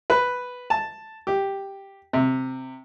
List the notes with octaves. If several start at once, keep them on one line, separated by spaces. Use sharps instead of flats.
B4
A5
G4
C3